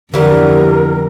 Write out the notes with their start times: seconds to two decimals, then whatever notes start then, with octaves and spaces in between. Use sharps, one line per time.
0.14 F2 D3 E3 G3 B3 A#4